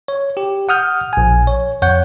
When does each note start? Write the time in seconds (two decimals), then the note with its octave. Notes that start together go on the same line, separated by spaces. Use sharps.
0.08 C#5
0.37 G4
0.69 F#5 D#6 F6 G6
1.13 A#1 G#5
1.47 C#5
1.82 F2 C#5 F#5 G6